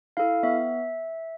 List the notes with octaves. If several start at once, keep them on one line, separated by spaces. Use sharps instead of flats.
E4 A4 F5
B3 E5